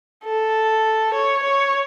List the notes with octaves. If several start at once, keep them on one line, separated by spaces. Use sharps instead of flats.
A4
C#5
C#5